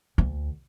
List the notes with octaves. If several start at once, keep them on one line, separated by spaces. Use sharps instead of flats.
D2